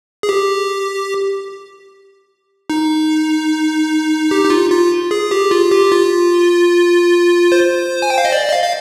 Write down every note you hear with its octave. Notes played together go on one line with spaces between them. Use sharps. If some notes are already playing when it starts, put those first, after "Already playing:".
G#4
G4
D#4
G4
D#4
F4
F4
G#4
G4
F4
G4
F4
C5
G#5
G5
F5
D#5
D5
D#5
F5
F5